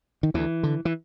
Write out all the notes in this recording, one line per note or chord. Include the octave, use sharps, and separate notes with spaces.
D#3
D2 E3
D3
E3